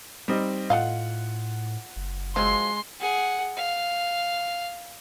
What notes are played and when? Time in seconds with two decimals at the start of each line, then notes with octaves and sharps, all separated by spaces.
0.28 G3 C4 D#4
0.70 A2 A3 F4 D#5 F5 F#5
1.96 F#1
2.36 F3 F#3 G#3 C6
3.00 G#4 F#5
3.57 F5